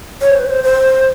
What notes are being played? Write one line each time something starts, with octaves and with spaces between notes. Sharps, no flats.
C#5
C5
B4
C#5
C5
C5